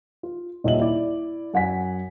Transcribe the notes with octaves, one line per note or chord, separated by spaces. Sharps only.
F4
D#1 A#2 D#5 E5 F#7
E4 D5
F#2 F#5 G#5 B6